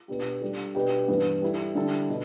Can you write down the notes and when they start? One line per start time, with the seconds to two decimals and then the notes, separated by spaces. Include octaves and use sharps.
0.08 B2 B3 D4 G4
0.42 G3 D4 A4
0.75 B2 B3 D4 G4
1.08 G2 E3 B3
1.42 G3 E4 A4
1.75 D3 G3 E4 A4
2.09 B2